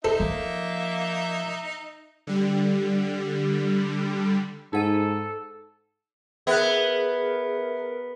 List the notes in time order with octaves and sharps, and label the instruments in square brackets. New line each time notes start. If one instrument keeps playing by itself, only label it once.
[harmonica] D#4 E5 [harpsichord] A4 [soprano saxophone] C5
[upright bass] F3 [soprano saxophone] A#3
[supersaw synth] D3 G3
[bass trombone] G#2 [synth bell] D#4 F#5 D#7 [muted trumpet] A4
[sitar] B3 [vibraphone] G#4 [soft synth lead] A#4 [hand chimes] E5 F#6